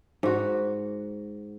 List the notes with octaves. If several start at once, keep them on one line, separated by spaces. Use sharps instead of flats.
G#2 F#4